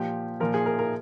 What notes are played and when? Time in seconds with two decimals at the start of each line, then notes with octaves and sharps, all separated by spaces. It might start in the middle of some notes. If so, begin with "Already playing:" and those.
Already playing: A#2 F3 G4
0.40 A#2 F3 A#4
0.54 G#4
0.66 A#4
0.79 A#4